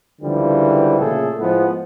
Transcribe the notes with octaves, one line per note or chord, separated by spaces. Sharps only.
C#2 D3 E3 F3 G3
A#2 C#3 A3 G#4 A4
A2 F3 G#3 B3